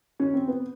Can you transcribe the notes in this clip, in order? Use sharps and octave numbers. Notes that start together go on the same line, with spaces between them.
C#4
C4
B3